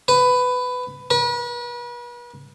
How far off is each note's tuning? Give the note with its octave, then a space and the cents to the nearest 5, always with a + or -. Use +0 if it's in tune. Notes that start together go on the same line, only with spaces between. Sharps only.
B4 +15
B4 -40